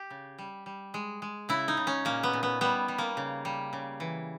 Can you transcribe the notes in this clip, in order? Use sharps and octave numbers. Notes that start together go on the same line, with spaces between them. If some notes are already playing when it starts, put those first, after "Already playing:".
Already playing: G4
C#3
G3
G3
G#3
G#3
C#3 E4
D#4
C#3
C#4
A#2 A#3
B3
A#2
B3
G3 B3
G3
A#3
C#3
G3
C#3
E3